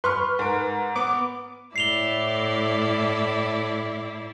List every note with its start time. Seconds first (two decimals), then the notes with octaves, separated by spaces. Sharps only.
0.04 B4 C6 C#6 F6
0.39 G#2 A#4 D7
0.96 B3 D6
1.76 A2 E4 D5 C7 F7 G7